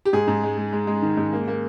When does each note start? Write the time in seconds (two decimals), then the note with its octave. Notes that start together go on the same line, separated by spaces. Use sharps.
0.05 G4
0.13 G#2 G#4
0.27 G#2
0.44 G#3
0.58 G#3
0.73 G#3
0.87 G#3
1.02 D#3
1.17 G#2
1.33 A#3
1.48 A#3